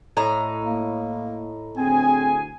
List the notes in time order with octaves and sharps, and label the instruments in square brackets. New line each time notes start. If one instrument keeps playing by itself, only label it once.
[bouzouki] A2 D#4 A#5
[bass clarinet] A#3
[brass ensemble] D2 G#4 G#5 [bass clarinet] C4